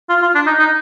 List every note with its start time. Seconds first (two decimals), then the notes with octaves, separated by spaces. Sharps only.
0.10 F4
0.22 F4
0.35 D4
0.47 D#4
0.60 D#4